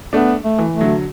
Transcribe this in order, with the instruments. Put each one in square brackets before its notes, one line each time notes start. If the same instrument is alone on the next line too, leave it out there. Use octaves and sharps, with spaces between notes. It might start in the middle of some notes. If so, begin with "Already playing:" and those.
[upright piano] A3 D4 [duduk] B3
[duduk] A3
[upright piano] E3
[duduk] A3
[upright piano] D3 F#3